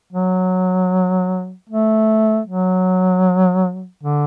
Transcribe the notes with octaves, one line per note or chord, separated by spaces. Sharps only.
F#3
A3
F#3
D3